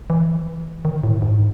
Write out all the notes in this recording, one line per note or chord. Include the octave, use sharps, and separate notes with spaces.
E3
D#3
A2
G#2